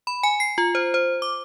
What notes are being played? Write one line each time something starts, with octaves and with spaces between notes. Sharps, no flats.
B5
G#5
C7
F4
C5
C5
D6